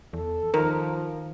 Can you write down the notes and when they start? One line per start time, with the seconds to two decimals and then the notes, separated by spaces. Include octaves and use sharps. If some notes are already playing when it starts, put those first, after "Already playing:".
0.13 E2 A4
0.54 D#3 F3 A#4